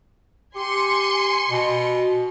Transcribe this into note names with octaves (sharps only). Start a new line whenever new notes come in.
G4 G#5 C6 C#7
B2